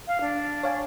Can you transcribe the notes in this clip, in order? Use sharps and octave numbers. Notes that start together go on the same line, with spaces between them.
F5
D4
C#5 F5 G#5